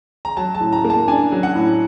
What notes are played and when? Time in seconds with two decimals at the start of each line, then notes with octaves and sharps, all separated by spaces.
0.25 A#5
0.37 F#3 A5
0.55 A5
0.60 A2
0.73 A#5
0.84 A#3
0.90 A5
1.08 D4 G#5
1.32 F#3
1.43 F#5
1.55 A2